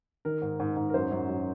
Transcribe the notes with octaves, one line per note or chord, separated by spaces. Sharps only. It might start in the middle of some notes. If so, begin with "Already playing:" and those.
D#3 A#4
G#2
G#2
G#2
A#4
F#2 C5
F#2
F#2